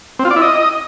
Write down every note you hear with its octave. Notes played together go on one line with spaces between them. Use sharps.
C4
F4
D5
E4
D#5